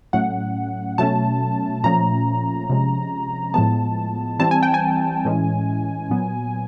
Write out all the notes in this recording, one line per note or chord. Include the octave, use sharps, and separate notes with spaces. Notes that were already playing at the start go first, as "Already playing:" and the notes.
A2 F#3 A3 C#4 F#5
B2 F#3 A3 C#4 A5
A#2 F3 A3 C#4 A#5
C3 F3 G#3 C#4
A2 F3 G#3 B3 A5
E3 G3 C4 A5
G#5
G5
G#5
A2 E3 G#3 C#4
A#2 F#3 B3